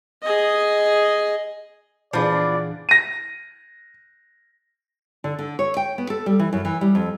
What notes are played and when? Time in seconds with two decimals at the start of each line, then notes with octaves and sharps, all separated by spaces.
0.23 G#4 D#5
2.13 A#2 E3 F3 B3 D4 G#4 D5
2.89 A#6 D#7
5.24 D3
5.39 D3
5.59 C#5
5.77 G5
5.98 B3
6.10 A4
6.26 G3
6.39 E3
6.53 F#2
6.65 E3
6.81 G3
6.95 F2